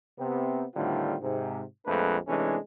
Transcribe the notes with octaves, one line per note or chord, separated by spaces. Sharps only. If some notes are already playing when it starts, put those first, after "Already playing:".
C3 B3 C4
A2 D3 D#3 G3 C4 F4
G#2 C3
A#1 F2 G#3 A3 D4 B4
C3 E3 G#3 A3 C#4 D4